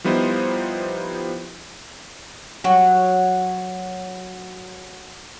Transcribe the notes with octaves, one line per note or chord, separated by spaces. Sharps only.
F3 G3 B3 D#4 E4 C5
F#3 F#4